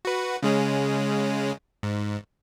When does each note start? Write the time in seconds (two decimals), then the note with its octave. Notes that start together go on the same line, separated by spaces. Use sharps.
0.05 F#4 B4
0.43 C#3 G#3 C#4
1.83 G#2